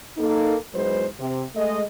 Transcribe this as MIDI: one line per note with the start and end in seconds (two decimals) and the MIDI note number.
0.18 0.55 58
0.18 0.55 63
0.18 0.55 69
0.74 1.06 40
0.74 1.06 44
0.74 1.06 54
0.74 1.06 56
0.74 1.06 71
0.74 1.06 72
1.19 1.42 48
1.56 1.81 56
1.56 1.81 57
1.56 1.81 75